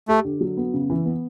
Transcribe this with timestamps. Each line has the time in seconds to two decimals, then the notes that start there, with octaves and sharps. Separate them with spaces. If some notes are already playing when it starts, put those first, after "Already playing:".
0.08 A3 G4
0.24 D3
0.41 F#3
0.57 B3
0.74 C#3
0.90 E3
1.05 B3